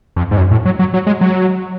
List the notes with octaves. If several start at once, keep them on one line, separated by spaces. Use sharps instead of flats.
F2
G#2
F#2
A2
F#3
F#3
F#3
G#3
F#3